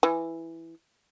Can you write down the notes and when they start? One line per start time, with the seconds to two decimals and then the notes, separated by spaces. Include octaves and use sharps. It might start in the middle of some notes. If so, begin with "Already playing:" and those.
0.03 E3